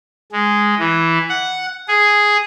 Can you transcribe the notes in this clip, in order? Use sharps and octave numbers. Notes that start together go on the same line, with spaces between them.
G#3
E3
F#5
G#4